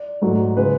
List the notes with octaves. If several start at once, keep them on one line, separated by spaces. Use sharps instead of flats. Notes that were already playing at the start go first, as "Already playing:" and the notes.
Already playing: D5
G#2 F#3 A3
C#3 G#3 B4